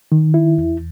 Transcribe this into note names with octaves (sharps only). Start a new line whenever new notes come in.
D#3
E4
E2